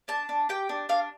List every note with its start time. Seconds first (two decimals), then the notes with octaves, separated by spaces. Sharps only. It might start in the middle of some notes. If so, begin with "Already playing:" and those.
0.08 D4 A5
0.29 D4
0.49 G4 G5
0.69 D4
0.89 D4 F5